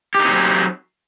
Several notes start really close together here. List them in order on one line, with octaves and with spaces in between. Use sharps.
G4 D#4 C4 F#3